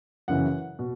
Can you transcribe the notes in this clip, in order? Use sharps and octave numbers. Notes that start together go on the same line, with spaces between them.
F#2 C#3 E3 F#5
B2